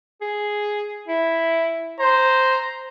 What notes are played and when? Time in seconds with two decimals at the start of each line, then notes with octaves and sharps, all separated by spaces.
0.21 G#4
1.08 E4
1.99 C5 A#5